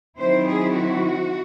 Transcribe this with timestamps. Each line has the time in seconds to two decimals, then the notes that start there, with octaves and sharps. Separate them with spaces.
0.18 D#3 F#3 C4 E4 C5
0.47 G#4
0.75 F#4